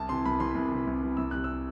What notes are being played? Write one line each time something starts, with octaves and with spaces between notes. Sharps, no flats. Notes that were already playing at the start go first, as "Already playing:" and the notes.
Already playing: C2 A5
C3 E3 C6
C2 B5
C3 E3 C6
C2
C3 E3
C2
C3 E3
C2 E6
C3 E3 G3 F#6
E6